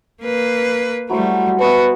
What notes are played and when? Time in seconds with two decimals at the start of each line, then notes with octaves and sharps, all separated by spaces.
0.23 A#3 B4
1.10 F#3 G3 A3 E4 C5
1.59 B3 F#4 B4 E5 A5